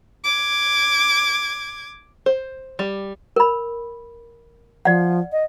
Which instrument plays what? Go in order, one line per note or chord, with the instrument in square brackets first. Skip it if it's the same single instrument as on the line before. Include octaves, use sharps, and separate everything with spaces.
[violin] D6 G#6
[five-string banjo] C5
G3
[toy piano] A#4 B5
[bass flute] F3 [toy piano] D5 F#5
[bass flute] D#5